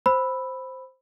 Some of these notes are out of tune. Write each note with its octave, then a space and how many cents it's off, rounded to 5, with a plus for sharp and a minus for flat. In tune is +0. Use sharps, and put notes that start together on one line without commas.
C5 +0 B5 +0 E6 +0